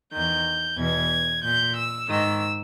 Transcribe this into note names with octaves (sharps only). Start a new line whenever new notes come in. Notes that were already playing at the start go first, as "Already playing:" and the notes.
E2 D#3 G6
E2 B2 G#6
A#2 G6
E6
G#2 D#3 E6